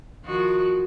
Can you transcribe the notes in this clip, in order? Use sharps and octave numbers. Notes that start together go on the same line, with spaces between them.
D#3 F3 F#4